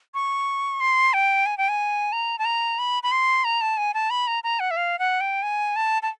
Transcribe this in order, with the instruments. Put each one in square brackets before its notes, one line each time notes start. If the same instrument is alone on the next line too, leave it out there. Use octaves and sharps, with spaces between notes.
[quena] C#6
C6
G5
G#5
G5
G#5
A#5
A5
A#5
B5
B5
C6
A#5
A5
G#5
A5
B5
A#5
A#5
F#5
E5
F5
F#5
G5
G#5
A5
A5